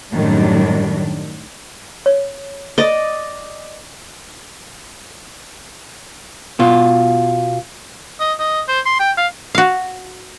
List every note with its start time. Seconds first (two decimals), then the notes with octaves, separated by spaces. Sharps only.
0.11 F#2 A2 D#3 F#3 G3 D4
2.06 C#5
2.78 D5 D#5
6.59 B2 F4
8.20 D#5
8.39 D#5
8.68 C5
8.86 C6
8.99 G5
9.17 F5
9.55 F#4 F5